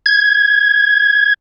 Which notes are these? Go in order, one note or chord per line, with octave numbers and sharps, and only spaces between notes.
G#6